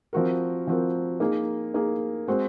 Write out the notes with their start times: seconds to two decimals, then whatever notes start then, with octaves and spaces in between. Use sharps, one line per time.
0.13 F3 C4 F#4 A#4
0.67 F3 C4 F#4 A#4
1.20 A#3 D#4 G#4
1.74 A#3 D#4 G#4
2.28 G#3 C4 F#4 C5